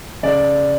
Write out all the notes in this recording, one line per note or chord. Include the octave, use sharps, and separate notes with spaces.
C#3 D5